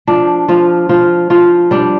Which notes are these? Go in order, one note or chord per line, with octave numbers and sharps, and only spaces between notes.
F3 D4
F3 F4
F3 F4
F3 F4
G3 D4